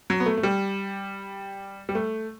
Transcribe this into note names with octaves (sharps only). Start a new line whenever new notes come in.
F#3
B3
A3
A3
G3
G3
A3